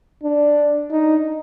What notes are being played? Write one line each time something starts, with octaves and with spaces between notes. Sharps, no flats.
D4
D#4